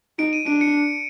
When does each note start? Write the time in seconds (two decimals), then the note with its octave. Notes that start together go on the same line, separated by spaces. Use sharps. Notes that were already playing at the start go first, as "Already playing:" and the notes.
0.19 D#4 D7
0.33 D#7
0.46 D4 D7
0.61 C#7